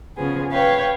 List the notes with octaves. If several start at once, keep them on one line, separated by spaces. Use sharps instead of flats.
C#3 F3 B3 G#4
B4 C#5 F5 G5